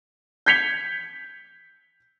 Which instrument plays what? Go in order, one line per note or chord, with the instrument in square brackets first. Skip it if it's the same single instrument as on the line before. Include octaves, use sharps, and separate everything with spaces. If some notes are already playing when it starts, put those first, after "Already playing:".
[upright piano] G6 G#6 B6 C#7 F7 G7